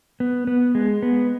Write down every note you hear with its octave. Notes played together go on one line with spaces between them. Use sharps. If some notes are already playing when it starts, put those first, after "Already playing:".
B3
B3
G#3
B3